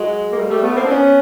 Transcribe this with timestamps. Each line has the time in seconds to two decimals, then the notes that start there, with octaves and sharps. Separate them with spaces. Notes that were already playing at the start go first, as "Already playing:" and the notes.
Already playing: F#3 G#3
0.31 A#3
0.37 G3 A3
0.50 G3 A3
0.63 A3 B3
0.76 A#3 C4
0.85 D4
0.89 B3 C#4